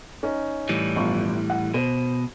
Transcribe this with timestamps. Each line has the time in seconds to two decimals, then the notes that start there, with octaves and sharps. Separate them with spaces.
0.23 C#4 D#4
0.69 A2 E3 G3
0.96 G1 F3 C#6
1.50 F#5
1.74 B2 C5